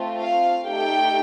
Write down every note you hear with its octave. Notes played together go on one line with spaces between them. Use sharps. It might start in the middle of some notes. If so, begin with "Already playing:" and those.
Already playing: A3 C4 F4
F5
A3 D#4 G4 G5